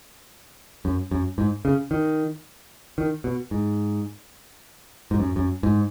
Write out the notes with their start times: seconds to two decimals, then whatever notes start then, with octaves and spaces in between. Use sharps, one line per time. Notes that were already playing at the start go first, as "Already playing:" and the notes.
0.85 F#2
1.11 F#2
1.38 G#2
1.65 C#3
1.91 D#3
2.98 D#3
3.24 B2
3.51 G#2
5.11 G#2
5.20 F#2
5.36 F#2
5.63 G#2